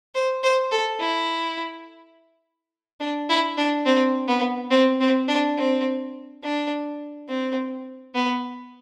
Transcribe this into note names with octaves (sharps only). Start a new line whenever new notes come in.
C5
C5
A4
E4
D4
E4
D4
C4
B3
C4
C4
D4
C4
D4
C4
B3